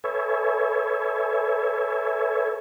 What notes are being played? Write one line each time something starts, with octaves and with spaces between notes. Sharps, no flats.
A4 B4 C#5 E5 G#5